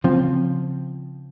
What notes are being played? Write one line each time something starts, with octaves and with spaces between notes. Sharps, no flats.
C#3 F3 C4